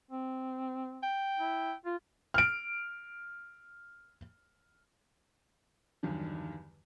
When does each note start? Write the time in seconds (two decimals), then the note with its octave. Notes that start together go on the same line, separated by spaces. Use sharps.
0.11 C4
1.03 G5
1.39 E4
1.85 F4
2.34 F6 D7
6.03 E2 G2 D3 D#3 F#3